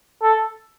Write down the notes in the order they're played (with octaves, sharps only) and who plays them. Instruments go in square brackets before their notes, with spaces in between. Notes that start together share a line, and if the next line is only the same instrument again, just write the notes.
[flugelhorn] A4